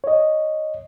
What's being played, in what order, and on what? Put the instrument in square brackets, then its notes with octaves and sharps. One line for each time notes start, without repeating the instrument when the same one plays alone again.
[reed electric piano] C#5 D#5